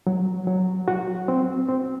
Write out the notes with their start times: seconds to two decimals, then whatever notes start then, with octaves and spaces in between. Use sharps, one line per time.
0.07 F#3
0.47 F#3
0.88 F#4
1.28 C4
1.69 C4